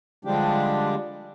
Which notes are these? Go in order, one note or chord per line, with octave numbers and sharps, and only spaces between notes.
D3 F3 G3 G#3 D4 G4